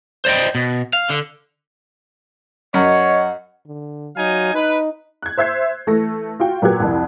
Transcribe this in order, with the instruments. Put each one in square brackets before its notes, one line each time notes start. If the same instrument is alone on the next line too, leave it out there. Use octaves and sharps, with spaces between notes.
[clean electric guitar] C5 D5 D#5 G5
B2
F5
D3
[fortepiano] F#2 [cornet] C#5 [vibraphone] D#5 [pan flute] F#5
[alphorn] D3
[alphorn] F#3 [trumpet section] D#4 F5 G#5
[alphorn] D#4 [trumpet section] B4
[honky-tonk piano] F#6 G#6
C5 E5 G6 G#6 C7
E3 A3 A4 A#6
F4 F#4 G5
A#2 F#3 B3 G4 F#6 G#6
C2 F2 E4